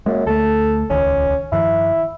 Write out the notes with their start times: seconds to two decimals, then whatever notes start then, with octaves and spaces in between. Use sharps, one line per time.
0.06 F#2 G#3 A#3
0.26 D2 A3 A4
0.90 D#1 C#2 D#3 C#4
1.52 G2 D#3 F3 E4